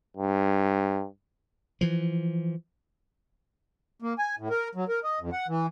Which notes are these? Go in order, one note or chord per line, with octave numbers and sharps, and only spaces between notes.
G2
E3 F3
A#3
G#5
A2
A#4
F#3
A#4
D#5
F2
F#5
E3